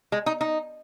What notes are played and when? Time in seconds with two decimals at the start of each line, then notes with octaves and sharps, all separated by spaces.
0.12 G#3
0.26 D#4
0.41 D#4